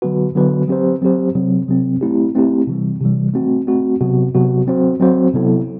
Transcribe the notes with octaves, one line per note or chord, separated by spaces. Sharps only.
D3 F#3 B3 F#4 B4
D3 F#3 B3 F#4 B4
F#3 C4 G4 C5
F#3 C4 G4 C5
C3 F#3 C4
C3 F#3 C4
A3 C4 E4 G4
A3 C4 E4 G4
C3 E3 G3
C3 E3 G3
A3 C4 F#4
A3 C4 F#4
C3 F#3 B3 F#4
C3 F#3 B3 F#4
F#3 C4 F#4 C5
F#3 C4 F#4 C5
C3 F#3 B3 E4 A4